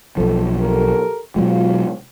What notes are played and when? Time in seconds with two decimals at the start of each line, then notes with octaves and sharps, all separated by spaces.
0.17 B1 F3 A4
0.61 G4 A4 A#4
1.36 B2 F#3 G#3 F4